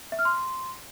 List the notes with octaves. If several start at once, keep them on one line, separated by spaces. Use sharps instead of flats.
E5
F6
C6